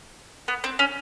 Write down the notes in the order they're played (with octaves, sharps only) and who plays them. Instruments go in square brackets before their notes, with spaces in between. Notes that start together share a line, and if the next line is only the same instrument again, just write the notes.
[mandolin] B3
C4
C#4